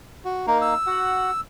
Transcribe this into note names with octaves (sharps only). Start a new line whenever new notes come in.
F#4
A#3 D#4 A#4
E6
F#4 F#5